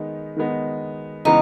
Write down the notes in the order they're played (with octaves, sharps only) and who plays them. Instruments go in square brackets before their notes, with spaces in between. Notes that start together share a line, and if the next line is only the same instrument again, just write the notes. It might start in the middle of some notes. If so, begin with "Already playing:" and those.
Already playing: [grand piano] D#3 G#3 B3 D#4
D#3 G#3 B3 D#4
[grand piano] C#3 E3 G#3 B3 [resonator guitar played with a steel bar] D#4